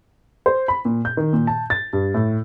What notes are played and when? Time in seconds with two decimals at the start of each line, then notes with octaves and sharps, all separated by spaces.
0.46 C5
0.68 B5
0.85 A#2
1.05 G6
1.17 D#3
1.33 A#2
1.47 A5
1.70 A6
1.93 G2
2.14 A2